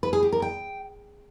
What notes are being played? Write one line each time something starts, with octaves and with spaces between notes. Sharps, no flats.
B4
G#4
G4
A#4
G5